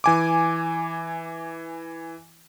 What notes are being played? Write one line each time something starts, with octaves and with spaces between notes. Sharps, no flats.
E3 G#5 D6